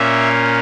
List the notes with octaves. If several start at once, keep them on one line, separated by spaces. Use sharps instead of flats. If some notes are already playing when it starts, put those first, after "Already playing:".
Already playing: A#2 A#3 C#4 E5